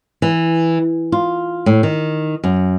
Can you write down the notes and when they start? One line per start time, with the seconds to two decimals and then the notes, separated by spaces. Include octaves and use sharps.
0.22 E3
1.12 F4
1.66 A2
1.83 D#3
2.44 F#2